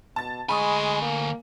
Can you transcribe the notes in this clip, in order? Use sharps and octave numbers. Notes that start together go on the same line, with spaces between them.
B2 A5 A6
D2 G#3 G#5 B5 C#6 D#6
A#3